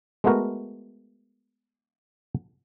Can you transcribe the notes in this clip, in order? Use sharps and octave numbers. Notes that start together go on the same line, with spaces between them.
G#3 A3 B3 F#4 A#4